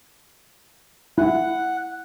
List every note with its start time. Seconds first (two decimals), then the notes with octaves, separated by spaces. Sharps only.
1.18 E4 F#5